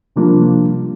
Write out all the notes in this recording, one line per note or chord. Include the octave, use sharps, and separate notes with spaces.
C3 F3 G3 A#3 D4 F4